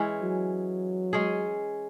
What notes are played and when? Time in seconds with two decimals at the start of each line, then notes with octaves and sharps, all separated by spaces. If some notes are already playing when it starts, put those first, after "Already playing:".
Already playing: E3 G#3 C#4
0.22 F#3
1.13 G#3 C#4 G#4